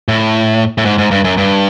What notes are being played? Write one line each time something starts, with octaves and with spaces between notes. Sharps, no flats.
A2
A2
G#2
G#2
G2
F#2
G2